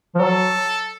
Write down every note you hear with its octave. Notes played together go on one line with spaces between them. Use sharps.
F3
F#3 A4